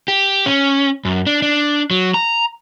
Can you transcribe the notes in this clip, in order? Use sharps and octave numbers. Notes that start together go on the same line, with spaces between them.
G4
C#4
F#2
D4
D4
F#3
A#5